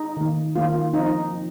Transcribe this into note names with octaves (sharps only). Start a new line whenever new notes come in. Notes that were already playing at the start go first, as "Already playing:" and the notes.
Already playing: D#4
D#3 A#3
D#3 A#3 F4
F3 C4 D#4
F3